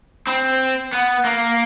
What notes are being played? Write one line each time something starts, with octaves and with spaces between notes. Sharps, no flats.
C4
B3
A#3